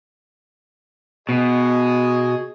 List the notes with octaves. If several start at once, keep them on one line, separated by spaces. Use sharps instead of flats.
B2 G#4 D#5